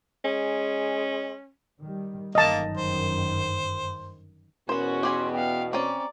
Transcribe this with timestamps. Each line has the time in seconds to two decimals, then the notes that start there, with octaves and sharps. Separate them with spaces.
0.25 G#3 C#4
1.81 D#3 G3
2.35 G1 F#2 D#3 A#3 D#5 A5
2.77 C5
4.69 E2 B2 B3 C#4 F#4 A#4 C5
5.03 G4 G#4 G#5 C6
5.32 B3 F5 G5
5.73 C4 C#4 D5 A#5